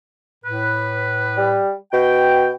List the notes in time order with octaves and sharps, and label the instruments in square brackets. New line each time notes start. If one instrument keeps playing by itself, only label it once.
[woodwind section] A2 B4
[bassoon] G3
[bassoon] B2 [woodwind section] G5